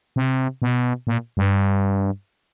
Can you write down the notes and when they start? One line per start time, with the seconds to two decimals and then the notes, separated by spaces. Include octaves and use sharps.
0.16 C3
0.62 B2
1.07 A#2
1.37 G2